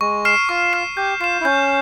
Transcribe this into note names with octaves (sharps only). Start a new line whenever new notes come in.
G#3 C#6
F6 C7 E7
F4 C#6
F6 C7 E7
G4 G6
F4 C7 E7
E4
C#4 G6